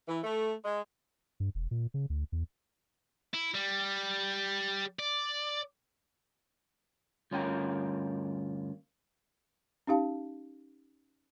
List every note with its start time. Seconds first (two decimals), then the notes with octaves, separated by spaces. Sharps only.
0.08 E3
0.23 A3
0.65 G#3
1.40 G2
1.55 E1
1.71 A#2
1.94 C#3
2.10 D2
2.32 E2
3.34 E4
3.54 G3
4.99 D5
7.31 D2 G2 C#4 F4 A#4 G5
9.87 C#4 D#4 G4 F5 A5